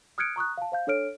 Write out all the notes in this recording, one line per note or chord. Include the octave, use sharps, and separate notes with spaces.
D#6 F6 F#6 G#6 C#7 D7
A#5 C#6 D#6 F#6
F5 A5
C5 F5 G6
D4 A4 C#5 F6 D7